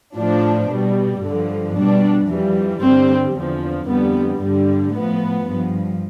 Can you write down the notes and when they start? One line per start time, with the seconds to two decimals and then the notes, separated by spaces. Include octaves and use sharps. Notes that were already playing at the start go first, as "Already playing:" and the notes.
0.16 A2 F3 D4
0.70 B2 G3
1.22 G2 D3 F3
1.75 B2 G3 D4
2.29 F2 E3 G3
2.82 G2 D3 G3 C4
3.36 E2 D3 F3
3.88 F2 D3 G3 B3
4.41 G2 D3 G3
4.94 A2 F3 B3
5.48 G2 F3